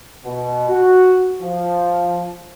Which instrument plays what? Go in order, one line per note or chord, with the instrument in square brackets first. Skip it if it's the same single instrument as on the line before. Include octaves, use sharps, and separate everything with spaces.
[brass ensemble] B2
F#4
F3